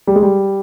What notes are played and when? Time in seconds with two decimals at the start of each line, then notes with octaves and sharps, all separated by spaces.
0.07 G3
0.15 G#3
0.23 G3